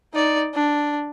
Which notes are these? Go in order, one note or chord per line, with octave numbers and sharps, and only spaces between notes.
D#4 D5
D4